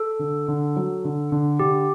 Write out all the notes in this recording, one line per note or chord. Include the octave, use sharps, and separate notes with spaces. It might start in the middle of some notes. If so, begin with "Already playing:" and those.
Already playing: A4
D3
D3
F#3
D3
D3
D3 G4